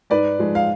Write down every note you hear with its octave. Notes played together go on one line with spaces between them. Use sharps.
G#2 B4 D5
F3 G#3
F5